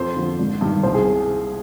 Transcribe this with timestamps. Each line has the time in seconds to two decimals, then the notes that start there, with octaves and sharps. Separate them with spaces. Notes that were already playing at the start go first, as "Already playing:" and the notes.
Already playing: F2 C5
0.16 D3 F3
0.38 G#1
0.61 G2 D#3
0.83 C2 C5
0.94 G#4